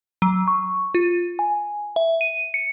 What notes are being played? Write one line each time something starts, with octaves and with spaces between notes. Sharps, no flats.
F#3
C#6
F4
G#5
E5
D#7
C#7